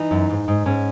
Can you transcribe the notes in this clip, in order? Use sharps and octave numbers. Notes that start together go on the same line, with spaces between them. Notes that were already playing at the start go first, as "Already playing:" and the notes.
Already playing: E3 D#4
F#2
G#2
G#2
G#2 C#4